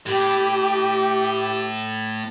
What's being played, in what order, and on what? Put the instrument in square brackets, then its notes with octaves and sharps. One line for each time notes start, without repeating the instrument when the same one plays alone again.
[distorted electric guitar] A2 [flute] G4